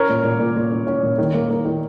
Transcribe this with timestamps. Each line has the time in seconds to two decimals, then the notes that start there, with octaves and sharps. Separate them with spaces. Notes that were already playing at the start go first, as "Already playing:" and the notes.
Already playing: C#4 A#4 C#5
0.09 A#2
0.24 A#2
0.40 A#2
0.57 A#2
0.71 C#4
0.87 C#4
1.03 A#2
1.18 D#3
1.34 A#3
1.50 A#3
1.65 D#3